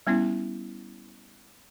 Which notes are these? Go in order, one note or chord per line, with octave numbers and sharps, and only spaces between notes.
G3 B3 C#4 E4